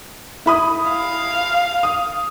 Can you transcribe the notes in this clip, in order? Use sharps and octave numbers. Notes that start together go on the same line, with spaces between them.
E4 B5 D#6
F5
D#6